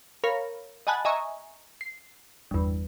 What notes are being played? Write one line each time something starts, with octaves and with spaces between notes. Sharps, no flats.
A#4 C#5 F5 B5
D#5 F#5 G#5 A5 B5 F#6
D#5 E5 G#5 A#5 C#6
C7
G1 E2